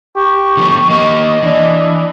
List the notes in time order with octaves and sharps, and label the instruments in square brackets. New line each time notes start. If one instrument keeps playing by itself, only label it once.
[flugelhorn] G4 [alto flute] C#6
[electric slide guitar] D3 F3 B3
[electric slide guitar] A#3 G4 [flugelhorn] D#5
[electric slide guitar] E3 [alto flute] D4